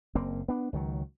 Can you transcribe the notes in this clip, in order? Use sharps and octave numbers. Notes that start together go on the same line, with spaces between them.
F#1 A#3 C4
B3 D4
C#2 D#3 F#3